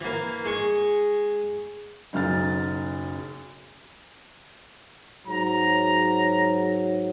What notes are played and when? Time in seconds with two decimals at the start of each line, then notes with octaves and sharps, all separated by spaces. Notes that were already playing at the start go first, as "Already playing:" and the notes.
0.01 E3 A#3
0.45 G#3 C#6
2.13 F#1 B1 F#3 F6 A6
5.26 G#2 F#3 A#5